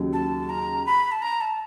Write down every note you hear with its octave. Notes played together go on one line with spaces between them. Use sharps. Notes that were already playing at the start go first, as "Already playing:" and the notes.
Already playing: D#2 C#3 F#3
A5
A#5
B5
A5
A#5
A5